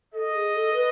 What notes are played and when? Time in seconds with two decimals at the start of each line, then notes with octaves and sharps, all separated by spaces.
0.14 A4 D#5
0.34 G#4
0.54 A4
0.74 B4